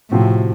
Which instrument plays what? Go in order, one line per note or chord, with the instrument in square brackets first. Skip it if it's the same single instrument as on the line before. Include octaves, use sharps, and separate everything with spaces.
[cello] A2 [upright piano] C3 F3 C4 F#4